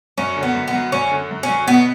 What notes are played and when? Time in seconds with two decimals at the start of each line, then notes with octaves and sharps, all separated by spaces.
0.18 F#2 C#4
0.36 D3
0.43 B3
0.55 F#2
0.68 B3
0.73 F#3
0.92 F#2 C#4
1.11 D3
1.31 F#2
1.43 C#4
1.49 F#3
1.68 B2 B3